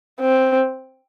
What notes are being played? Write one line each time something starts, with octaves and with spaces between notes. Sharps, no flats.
C4